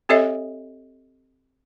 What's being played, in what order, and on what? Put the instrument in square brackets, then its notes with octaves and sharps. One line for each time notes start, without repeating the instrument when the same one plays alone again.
[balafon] C4 G4 A4 C#5 D#5 E5